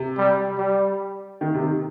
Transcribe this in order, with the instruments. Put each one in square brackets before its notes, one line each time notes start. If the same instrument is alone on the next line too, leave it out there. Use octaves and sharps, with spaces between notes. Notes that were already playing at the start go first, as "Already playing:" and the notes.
Already playing: [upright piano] C3
[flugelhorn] G3
G3
[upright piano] D#3
C3
D#3